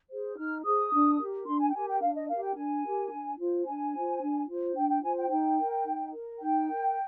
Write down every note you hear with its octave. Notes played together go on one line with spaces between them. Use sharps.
G#4 C5
D#4 F6
G#4 C5 D#6
D4
G4 A#4
D4 C6
G#5
G5
G4 A#4 G#5
G5
D4 F5
D#5
G4 A#4 F5
G5
D4 G#5
G4 A#4
D4
F4 C5
D4 G#5
F4 C5
D4
F4 C5
D4 G5
G5
F4 C5 G#5
G5
D#4 G5
A#4
D#4
A#4
D#4 G5
A#4